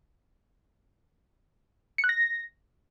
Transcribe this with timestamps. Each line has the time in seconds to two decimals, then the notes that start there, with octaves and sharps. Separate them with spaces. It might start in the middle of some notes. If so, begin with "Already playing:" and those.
1.98 C#7
2.04 F#6
2.09 A#6